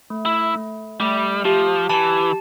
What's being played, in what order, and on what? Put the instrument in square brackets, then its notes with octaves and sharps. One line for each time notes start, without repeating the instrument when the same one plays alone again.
[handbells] A3
[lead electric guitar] E4
[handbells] A3
[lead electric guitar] G3 [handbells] A3
[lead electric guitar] F3 [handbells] G4
[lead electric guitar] E3 [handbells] A5